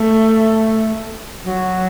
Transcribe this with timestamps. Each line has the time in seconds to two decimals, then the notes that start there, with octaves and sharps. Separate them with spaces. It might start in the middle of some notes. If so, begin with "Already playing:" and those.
Already playing: A3
1.45 F#3